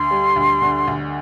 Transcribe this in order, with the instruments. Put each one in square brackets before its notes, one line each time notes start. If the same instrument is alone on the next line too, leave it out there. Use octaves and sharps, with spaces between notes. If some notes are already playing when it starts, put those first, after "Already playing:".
Already playing: [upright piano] D2 [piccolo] C6
[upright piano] G3
D2
D3
D2